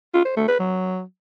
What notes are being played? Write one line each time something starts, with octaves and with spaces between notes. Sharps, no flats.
F4
C5
A3
B4
F#3